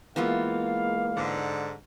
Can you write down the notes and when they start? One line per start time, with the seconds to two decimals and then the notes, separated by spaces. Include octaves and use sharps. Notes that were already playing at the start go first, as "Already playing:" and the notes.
0.16 E3 G#3 A#3 B3 F4 F5
1.16 G#2 D3